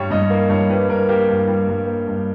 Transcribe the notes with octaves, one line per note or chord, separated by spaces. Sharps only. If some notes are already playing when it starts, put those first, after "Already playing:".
Already playing: G2 G3 C#5
G2 D#5
A#3
G2 C#5
G3 B4
G2 A#4
A#3 G4
G2
G3
G2
A#3
G2